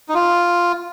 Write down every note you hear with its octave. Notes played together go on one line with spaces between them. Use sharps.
D#4
F4